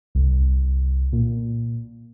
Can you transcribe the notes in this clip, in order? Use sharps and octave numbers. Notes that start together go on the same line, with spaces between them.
C2
A#2